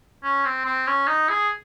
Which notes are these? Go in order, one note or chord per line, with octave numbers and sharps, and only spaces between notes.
C#4
C4
C4
C#4
D#4
G#4